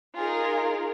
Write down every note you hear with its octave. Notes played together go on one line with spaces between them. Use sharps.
D#4 F4 G#4 A#4